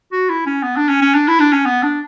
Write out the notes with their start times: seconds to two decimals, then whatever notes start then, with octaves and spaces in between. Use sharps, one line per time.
0.12 F#4
0.30 E4
0.46 C#4
0.63 B3
0.77 D4
0.89 C#4
1.02 C#4
1.14 D4
1.28 E4
1.40 D4
1.53 C#4
1.66 B3
1.83 D4